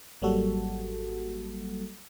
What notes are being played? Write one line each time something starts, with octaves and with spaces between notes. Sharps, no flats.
G#1 F#3 G3 A#3 F#4 A4